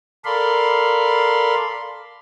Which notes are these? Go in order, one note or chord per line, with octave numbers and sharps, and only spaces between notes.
A4 A#4 D5 F5 B5 C6